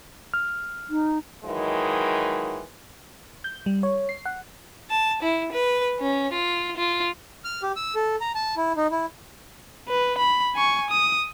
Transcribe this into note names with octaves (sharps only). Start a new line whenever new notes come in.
F6
D#4
D#3 E3 F#3 G#3
G6
G3
C#5
C7
F#5
A5
E4
B4
C#4
F4
F4
F6
G4
E6
A4
A#5
A5
E4
D#4
E4
B4
B5
G#5 C#6
D#6